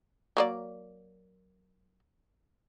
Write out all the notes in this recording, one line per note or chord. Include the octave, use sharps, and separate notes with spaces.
F#3 A#3 D5